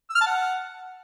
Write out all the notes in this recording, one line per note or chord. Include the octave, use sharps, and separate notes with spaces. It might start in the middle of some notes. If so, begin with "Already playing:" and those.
E6
F6
A5
F#5